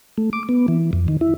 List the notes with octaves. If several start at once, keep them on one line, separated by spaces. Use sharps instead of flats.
A3
D6
B3
E3
F2
D#3
E4